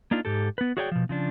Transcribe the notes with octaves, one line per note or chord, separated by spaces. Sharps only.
A#3 D4 D#4 F4
G#2 G4 A4
B3 B4
F#4 G#4 C#5 D5 F5 G5
B2 F3
C#3 F3 D4